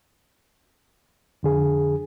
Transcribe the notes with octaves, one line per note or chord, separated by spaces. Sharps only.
F2 D3 G#4